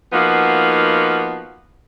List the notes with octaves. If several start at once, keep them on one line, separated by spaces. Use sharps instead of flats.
F3 A#3 B3 D#4 F#4